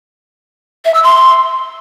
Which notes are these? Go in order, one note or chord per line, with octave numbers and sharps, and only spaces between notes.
E5
E6
C6